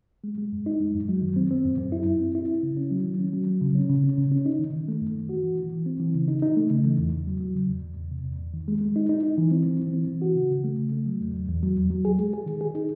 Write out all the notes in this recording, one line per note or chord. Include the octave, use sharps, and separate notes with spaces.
G#3
G#3
F#2
D#4
G#3
F#2
F#3
D#3
C4
C4
F#2
F#2
E4
E4
C4
E4
E4
C#3
C#4
F#3
D#3
C#4
F#3
F#3
C#3
C#4
C#3
C#4
C#3
C#4
D#4
D#3
D#3
A3
F#2
D#3
F#4
E3
E3
E3
C4
E3
C#3
D#4
D#4
A3
C#3
E3
E2
E2
F#3
F#3
C#3
E2
E2
E2
C3
E2
E2
D#3
G#3
G#3
D#4
D#4
D#4
E3
C4
E3
E3
C4
E3
F#4
C#3
C#3
A3
C#3
A3
F#3
E2
E2
E2
F#3
E2
F#3
G#4
G#3
G#4
D#3
G#4
D#4